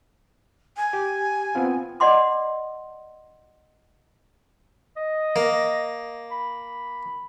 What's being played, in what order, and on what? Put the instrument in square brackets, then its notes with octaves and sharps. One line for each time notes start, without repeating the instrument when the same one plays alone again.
[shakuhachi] G#5
[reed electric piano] G4
B3 C4 F4
[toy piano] D5 D#5 F#5 C6 D6
[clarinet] D#5
[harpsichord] A#3
[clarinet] B5